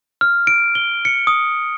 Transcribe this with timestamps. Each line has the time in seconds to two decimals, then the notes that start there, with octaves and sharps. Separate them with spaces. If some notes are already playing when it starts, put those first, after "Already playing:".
0.21 F6
0.47 D7
0.75 G7
1.05 C#7
1.27 D#6